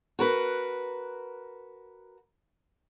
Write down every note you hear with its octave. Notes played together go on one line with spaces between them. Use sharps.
F#4 A#4 B4